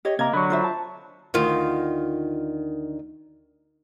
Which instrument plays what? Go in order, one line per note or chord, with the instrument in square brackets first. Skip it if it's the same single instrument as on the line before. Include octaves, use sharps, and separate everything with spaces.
[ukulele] G4 C#5 D#5
[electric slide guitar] C3 [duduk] A#3 [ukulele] D#5 [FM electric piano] A#5 G#6
[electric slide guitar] D3 [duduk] F#3 [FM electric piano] B5 C#6
[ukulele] F4 C5 E5
[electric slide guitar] A5
[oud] D2 D#3 F4